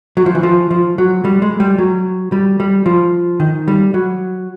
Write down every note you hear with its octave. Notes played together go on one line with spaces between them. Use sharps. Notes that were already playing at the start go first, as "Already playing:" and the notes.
F#3
F3
E3
F3
F3
F#3
G3
G#3
G3
F#3
G3
G3
F3
D#3
G3
F#3